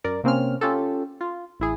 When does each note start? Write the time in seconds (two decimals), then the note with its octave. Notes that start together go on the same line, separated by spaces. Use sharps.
0.04 F#2 A#4 D5
0.24 C3 A#3 C4 C#4 F6
0.61 C#4 F4 G4 A4
1.21 F4
1.60 A1 E4 G#4